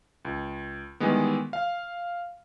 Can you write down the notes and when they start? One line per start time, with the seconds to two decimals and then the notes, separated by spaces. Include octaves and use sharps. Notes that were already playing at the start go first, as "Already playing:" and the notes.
0.25 C#2
1.00 D#3 E3 G3 G#3 B3
1.53 F5